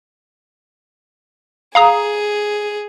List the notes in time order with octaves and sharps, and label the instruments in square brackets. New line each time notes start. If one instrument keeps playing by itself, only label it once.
[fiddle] G#4 [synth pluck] F5 A#5 D#6